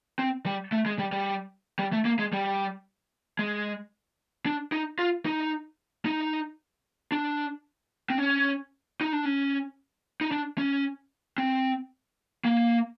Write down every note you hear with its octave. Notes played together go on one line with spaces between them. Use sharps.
C4
G3
A3
G#3
G3
G3
G3
A3
A#3
G#3
G3
G#3
D4
D#4
F4
D#4
D#4
D4
C4
C#4
D#4
D4
C#4
D#4
D4
C#4
C4
A#3